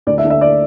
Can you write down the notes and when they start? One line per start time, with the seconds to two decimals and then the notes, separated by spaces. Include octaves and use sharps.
0.07 D2 D5
0.18 E5
0.24 D3 A3
0.30 E5
0.41 D5